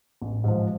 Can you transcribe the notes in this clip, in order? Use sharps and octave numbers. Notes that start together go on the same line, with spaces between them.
A1
G#2 F3